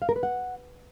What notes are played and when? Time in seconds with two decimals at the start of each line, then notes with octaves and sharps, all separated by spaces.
0.02 F5
0.09 A#4
0.16 B4
0.23 F#5